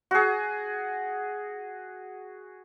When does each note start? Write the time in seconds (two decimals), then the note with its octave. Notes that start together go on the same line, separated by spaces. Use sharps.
0.11 F#4 G#4